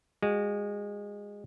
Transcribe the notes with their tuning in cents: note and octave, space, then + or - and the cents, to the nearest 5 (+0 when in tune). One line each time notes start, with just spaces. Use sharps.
G#3 -20 F#4 +0